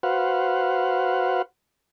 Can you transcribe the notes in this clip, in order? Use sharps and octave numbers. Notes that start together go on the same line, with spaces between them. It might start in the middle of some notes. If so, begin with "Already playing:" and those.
F#4 B4 C5 F5 F#5